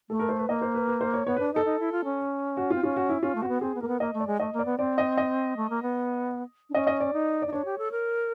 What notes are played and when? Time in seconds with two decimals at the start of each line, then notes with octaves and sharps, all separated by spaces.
0.10 A3 A4
0.19 A#4
0.29 C5
0.39 B4
0.49 A#3 D#5
0.62 C5
0.75 B4
0.88 B4
1.01 C5
1.14 C#5
1.26 B3 C#5
1.36 B4
1.39 D4
1.53 D#4 A4
1.65 D#4
1.80 E4
1.92 F4
2.04 C#4
2.57 F#4
2.70 C4 F4
2.83 C#4 F4
2.96 F#4
3.09 E4
3.22 C#4 F4
3.35 A3
3.42 C4 F#4
3.48 B3
3.61 C4 G#4
3.75 B3
3.81 A#3 A#4
3.88 B3
4.00 A#3 D#5
4.14 A3
4.20 D5
4.27 G#3
4.40 A3 D#5
4.53 A#3
4.59 D5
4.65 B3
4.78 C4 D5
4.98 D#5
5.17 D#5
5.57 A3
5.70 A#3
5.82 B3
6.70 D4
6.74 C#4 D#5
6.87 D#5
7.00 D5
7.13 D#4
7.42 D5
7.47 D#4
7.52 D4 C#5
7.65 G4
7.78 A4
7.91 A#4